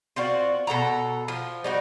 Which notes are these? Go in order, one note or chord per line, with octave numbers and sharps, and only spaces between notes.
C4 F4 F#4 D5
B2 A4 F#5 A#5
F3
G3 D#4 F#4